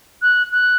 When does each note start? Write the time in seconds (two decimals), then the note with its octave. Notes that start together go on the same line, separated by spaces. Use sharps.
0.22 F#6
0.52 F#6